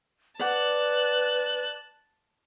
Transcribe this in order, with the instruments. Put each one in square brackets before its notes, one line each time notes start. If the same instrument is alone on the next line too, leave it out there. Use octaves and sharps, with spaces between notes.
[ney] B4 [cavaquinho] D5 F#5 [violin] A5 F#6